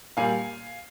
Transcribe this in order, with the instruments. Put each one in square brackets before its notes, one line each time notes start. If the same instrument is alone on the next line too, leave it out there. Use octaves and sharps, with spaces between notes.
[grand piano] A#2 G3 F5 G#5